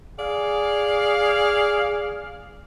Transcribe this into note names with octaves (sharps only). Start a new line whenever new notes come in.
G#4 D5 F5